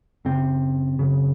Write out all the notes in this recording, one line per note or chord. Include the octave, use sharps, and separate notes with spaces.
F#2 C#3 C4
F#2 C#3